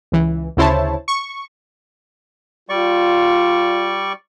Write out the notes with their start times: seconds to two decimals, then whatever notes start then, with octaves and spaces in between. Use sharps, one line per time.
0.12 C#2 E3
0.57 D2 C#3 E4 C5 C#5 A5
1.08 C#6
2.69 G3 F4 D5 C#6